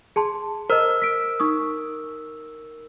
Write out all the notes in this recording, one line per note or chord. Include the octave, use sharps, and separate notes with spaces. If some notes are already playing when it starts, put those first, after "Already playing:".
G#4 A5 C6
A#4 C5 D#5 E6
B6 D7
D#4 C#6 D#6